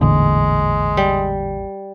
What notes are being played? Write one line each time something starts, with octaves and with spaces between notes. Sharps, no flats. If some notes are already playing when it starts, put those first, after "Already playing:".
A1 E2 A#2 D3 G#3
G3